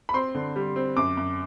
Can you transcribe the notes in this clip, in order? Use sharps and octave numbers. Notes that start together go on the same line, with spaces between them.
B5
C4 C6
D3
G3
C4
F#2 D6
F#2